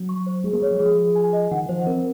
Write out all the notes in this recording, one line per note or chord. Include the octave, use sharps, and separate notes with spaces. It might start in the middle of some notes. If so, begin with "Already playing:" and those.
Already playing: F#3
C#6
C5
G#3 G#4
A#3
G#3 C#5
F#3
F3 G#4
G#4
G#5
D#5
D#3 F#5
F3 C5
C4 A#4